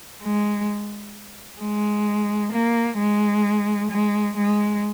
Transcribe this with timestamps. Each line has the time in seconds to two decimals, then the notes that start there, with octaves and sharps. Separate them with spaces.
0.23 G#3
1.61 G#3
2.53 A#3
2.99 G#3
3.91 G#3
4.37 G#3